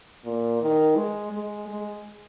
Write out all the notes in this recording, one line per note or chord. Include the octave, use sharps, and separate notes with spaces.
A#2
D#3
G#3
G#3
G#3